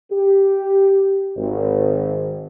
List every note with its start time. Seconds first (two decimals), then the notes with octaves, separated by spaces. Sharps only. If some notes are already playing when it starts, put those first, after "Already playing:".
0.11 G4
1.36 G#1